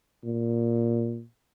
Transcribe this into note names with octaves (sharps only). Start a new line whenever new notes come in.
A#2